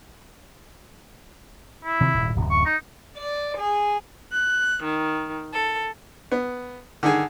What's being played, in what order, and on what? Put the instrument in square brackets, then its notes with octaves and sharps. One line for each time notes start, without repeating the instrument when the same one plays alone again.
[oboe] E4
[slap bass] C3 D#3 F3
D#1 G#2
D1 F#2 C3
[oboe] C#6
D#4
[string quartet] D5
G#4
F#6
D#3
A4
[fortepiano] B3
D3 D#3 G#4